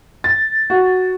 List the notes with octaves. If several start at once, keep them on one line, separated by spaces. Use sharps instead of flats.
A6
F#4